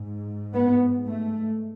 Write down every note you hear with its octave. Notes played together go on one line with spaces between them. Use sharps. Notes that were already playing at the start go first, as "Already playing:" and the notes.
Already playing: G#2
B3
A3